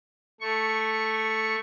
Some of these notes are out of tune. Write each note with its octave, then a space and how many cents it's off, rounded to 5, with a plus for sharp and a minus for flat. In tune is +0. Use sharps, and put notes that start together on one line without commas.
A3 +0 C#6 +0